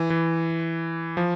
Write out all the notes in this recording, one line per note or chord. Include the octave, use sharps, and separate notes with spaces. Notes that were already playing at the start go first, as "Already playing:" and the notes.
Already playing: E3
E3
F3